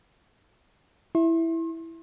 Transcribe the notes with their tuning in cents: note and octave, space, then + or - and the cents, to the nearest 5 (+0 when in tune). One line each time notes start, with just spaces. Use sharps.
E4 +0 C6 +40